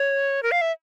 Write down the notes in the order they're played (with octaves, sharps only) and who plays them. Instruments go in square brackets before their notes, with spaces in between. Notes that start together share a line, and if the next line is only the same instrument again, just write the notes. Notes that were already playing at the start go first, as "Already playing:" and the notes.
Already playing: [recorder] C#5
A#4
F5
E5